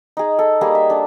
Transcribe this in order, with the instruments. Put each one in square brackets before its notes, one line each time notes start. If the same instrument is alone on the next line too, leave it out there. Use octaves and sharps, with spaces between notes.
[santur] D#4 G#4
A4
G3 A#3 D#4 G#4
E5
D4 A4